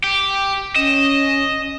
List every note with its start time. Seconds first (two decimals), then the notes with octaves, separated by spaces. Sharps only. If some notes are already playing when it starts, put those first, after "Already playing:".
0.04 G4
0.76 C#4 D#5 E7